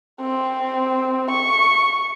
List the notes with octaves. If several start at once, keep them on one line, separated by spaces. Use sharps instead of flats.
C4
C#6